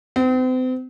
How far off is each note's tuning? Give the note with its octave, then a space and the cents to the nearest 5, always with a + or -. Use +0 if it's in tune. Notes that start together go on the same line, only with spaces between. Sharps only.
C4 -40